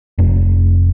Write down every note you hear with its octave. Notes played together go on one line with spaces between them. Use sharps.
F1